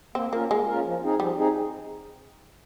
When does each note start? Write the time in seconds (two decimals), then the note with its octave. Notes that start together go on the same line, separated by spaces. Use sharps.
0.15 A#3 C4
0.33 A#3 C#4 F4 A#4
0.50 G#3 A#3
0.68 C#4 F4 A#4
0.85 F3
1.02 C4 D#4 G#4
1.20 F3 G3
1.37 C4 D#4 G#4